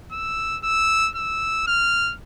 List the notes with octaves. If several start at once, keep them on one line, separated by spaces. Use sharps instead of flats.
E6
E6
E6
F6